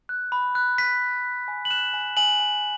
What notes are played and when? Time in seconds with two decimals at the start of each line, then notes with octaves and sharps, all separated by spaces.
0.09 F#6
0.32 B5
0.55 F#6
0.78 F#6 B6
1.01 F#6
1.25 F#6
1.48 G#5
1.65 F#7
1.71 F#6 E7
1.94 G#5
2.17 G#5 F#7
2.40 G#5